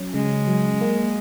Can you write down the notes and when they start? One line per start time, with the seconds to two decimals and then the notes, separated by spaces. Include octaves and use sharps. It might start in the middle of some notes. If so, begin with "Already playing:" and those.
Already playing: F#3 C#4
0.14 C#3 G#3
0.47 F#3
0.81 A#3